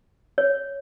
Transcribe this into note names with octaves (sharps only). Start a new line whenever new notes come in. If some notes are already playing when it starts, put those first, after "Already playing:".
C#5